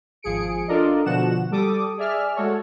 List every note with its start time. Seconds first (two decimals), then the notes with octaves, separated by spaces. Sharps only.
0.23 G#1 F3 G#4 C#7 D7
0.68 D4 F4 A4 A#4 D5 D#5
1.05 B2 D3 F3 F#4 F#5 E7
1.51 G3 A4 D6 D#6
1.97 G#4 D5 E5 F6
2.35 G#3 F#4 A4 C#5